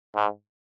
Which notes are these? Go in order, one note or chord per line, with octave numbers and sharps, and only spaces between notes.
G#2